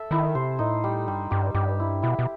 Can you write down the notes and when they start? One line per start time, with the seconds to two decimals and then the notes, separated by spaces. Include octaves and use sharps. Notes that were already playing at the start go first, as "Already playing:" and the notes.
Already playing: A4 E5
0.11 D#3 E4
0.35 C3 C5
0.59 A2 D#4
0.84 G3
1.08 G2 G3
1.31 G2 G4
1.55 G2 G4
1.80 E4
2.02 B2 E4
2.19 B2